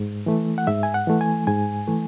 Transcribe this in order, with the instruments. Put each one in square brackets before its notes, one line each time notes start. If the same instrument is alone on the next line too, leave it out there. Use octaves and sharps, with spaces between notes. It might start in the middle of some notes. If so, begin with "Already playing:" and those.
Already playing: [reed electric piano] G#2
E3 A3
F#5
G#2 E5
G#5
F#5
E3 A3
G#5
G#2 G#5
E3 A3